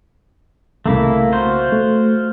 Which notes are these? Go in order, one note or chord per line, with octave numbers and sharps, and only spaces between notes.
C2 C#3 A3 A#3 E4
F4 F#4 C5
A3